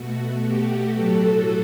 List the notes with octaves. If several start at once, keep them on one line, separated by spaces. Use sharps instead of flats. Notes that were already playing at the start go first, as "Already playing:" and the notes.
Already playing: B2 A3 F#4
G4
A2 F#3 A3 F#4 A4